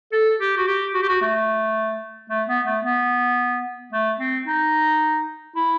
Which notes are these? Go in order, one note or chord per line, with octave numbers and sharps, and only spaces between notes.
A4
G4
F#4
G4
F#4
G4
F#4
A3
A3
B3
A3
B3
A3
C4
D#4
E4